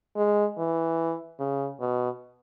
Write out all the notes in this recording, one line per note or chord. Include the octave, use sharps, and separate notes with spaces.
G#3
E3
C#3
B2